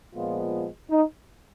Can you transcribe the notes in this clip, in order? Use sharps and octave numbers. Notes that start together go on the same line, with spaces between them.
A#2 F3 G#3 B3 F4
D#4